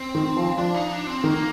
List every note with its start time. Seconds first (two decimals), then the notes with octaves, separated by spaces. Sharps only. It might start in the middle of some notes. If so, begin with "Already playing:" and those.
Already playing: C4
0.15 D#3
0.37 F3
0.58 F3 D4
0.74 D#4
0.92 D4
1.07 C4
1.24 D#3 A#3